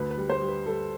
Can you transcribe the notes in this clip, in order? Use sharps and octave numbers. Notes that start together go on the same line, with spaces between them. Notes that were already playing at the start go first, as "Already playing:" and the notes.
Already playing: D2 B4
B4
G3
C5
G3
B4
G3 A4